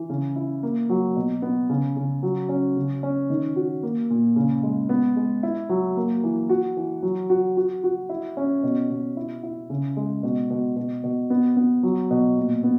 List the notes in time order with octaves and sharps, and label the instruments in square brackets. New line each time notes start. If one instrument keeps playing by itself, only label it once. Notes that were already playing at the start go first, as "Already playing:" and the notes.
Already playing: [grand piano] E3
C#3
E4
A#3
F#3
B2
B3
C#3
C#3
F#3
C#4
C#3
C#4
D#3
F#4
A#3
A#2
C#3
G#3
B3
G#3
E4
F#3
A#3
E3
F#4
E3
F#3
F#4
F#4
F#4
E4
C#4
B2
B2
E4
E4
C#3
G#3
B2
B2
B2
B2
B3
B3
F#3
B2
A#2
B3